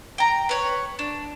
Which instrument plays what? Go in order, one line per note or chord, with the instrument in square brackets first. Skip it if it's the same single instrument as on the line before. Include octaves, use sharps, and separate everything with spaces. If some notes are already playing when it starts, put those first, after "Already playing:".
[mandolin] G5 A#5
B4 C#5
D4